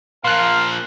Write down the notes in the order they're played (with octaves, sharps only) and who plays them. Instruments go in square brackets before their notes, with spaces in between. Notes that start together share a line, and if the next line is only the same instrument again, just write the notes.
[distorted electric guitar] A#2 F3 [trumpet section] A#4 F5 [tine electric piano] C6 F#6